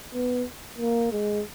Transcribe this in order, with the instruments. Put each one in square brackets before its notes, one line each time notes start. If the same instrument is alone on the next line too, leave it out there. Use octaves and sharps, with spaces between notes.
[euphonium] B3
A#3
G#3